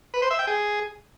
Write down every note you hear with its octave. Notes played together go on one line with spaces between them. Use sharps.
B4
C5
E5
G5
G#4